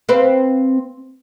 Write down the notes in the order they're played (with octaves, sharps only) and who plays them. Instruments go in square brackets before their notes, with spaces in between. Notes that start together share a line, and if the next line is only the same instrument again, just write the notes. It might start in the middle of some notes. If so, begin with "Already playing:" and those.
[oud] C4 B4 F5